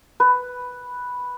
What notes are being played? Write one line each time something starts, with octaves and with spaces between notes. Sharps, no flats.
B4